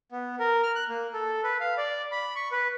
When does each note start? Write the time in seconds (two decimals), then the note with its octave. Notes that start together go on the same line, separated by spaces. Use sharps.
0.12 B3
0.39 A#4
0.63 F6
0.76 F#6
0.89 A#3
1.13 A4
1.44 B4
1.61 F5
1.78 D5
2.12 B5
2.36 C#6
2.52 B4